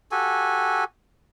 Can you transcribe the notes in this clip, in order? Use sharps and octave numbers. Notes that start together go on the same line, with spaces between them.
F#4 G4 A4 G#5